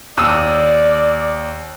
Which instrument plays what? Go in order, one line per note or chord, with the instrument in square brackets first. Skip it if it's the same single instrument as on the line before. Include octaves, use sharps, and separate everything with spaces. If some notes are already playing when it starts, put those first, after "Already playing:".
[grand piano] D#2 D#6 E6 [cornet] D5